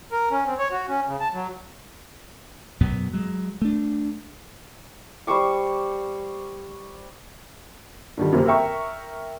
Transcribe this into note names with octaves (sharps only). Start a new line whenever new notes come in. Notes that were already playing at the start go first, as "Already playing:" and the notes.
A#4
C#4
C4
C#5
F#4
C#4
C#3
A5
F#3
F#2 B2 F#3 B3
F#3 G#3
A3 D4
G3 C5 C#6 D6
D3 D#3 G3
F#2 C3 A#3 C4
A#4 E5 G5 C#6